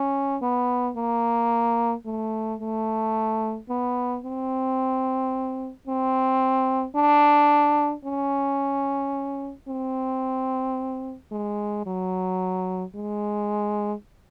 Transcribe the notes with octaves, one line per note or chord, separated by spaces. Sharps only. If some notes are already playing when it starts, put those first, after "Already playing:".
Already playing: C#4
B3
A#3
A3
A3
B3
C4
C4
D4
C#4
C4
G#3
F#3
G#3